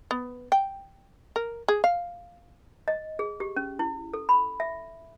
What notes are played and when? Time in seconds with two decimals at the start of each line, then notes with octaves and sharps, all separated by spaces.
0.11 B3
0.52 G5
1.36 A#4
1.68 G#4
1.84 F5
2.88 D#5
3.19 G#4
3.40 G4
3.56 C#4
3.79 E4
4.14 A4
4.29 B5
4.60 E5